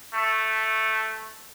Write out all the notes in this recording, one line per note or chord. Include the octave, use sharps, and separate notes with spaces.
A3